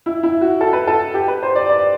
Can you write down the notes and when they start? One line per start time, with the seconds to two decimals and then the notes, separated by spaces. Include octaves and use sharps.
0.06 E4
0.23 E4
0.41 F#4
0.61 A4
0.73 B4
0.87 A4
1.14 G4
1.28 B4
1.43 C5
1.55 D5
1.69 D5